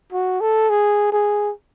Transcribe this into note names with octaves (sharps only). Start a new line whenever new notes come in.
F#4
A4
G#4
G#4